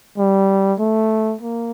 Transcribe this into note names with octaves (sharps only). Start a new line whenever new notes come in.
G3
A3
A#3